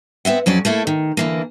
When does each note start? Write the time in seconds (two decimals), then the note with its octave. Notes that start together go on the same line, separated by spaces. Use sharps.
0.25 B3 C4 E5 F#5
0.46 F2 F#3 C#4 D5
0.65 A3 A#3 E4 A4
0.87 D#3
1.17 D3 E3 A#3